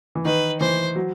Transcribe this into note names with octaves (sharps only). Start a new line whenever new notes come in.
E3
D#3 B4
E3 C5
F#3